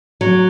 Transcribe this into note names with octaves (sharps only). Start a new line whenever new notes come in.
F#3